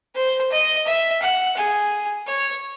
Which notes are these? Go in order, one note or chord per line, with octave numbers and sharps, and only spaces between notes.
C5
D#5
E5
F#5
G#4
C#5